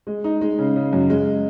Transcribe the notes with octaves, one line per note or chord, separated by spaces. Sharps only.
G#3
D#4
G#3
C#3
C#3
F#2
G#3